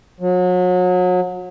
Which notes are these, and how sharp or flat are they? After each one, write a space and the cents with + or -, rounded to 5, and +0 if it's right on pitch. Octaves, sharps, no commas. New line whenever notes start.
F#3 -35